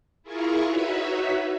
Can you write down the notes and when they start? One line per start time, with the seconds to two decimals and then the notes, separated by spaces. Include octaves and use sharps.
0.23 E4 F4 G#4 A#4 C#6
0.65 D#4 F#4 B4 C#5 E5 B5